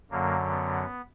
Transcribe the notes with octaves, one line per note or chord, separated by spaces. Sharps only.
F#2 D3 F#3 A#3
B3